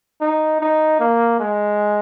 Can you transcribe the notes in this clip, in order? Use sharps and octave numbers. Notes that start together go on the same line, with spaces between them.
D#4
D#4
A#3
G#3